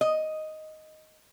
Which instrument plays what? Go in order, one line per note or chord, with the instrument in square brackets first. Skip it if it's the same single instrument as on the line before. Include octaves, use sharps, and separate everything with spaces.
[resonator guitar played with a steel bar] D#5